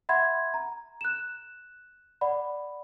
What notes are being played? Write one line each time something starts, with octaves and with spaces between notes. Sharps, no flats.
E5 F#5 B5 C6 G#6
A#5
F#6 E7
D5 F#5 B5